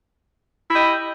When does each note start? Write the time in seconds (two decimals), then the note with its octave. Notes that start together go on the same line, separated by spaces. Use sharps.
0.71 E4
0.73 G4
0.76 D#5